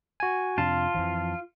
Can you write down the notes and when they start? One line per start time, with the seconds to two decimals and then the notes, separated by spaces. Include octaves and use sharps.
0.20 F#4 G#5
0.58 F2 C3 D4 F4 A5
0.95 F2 E3 F3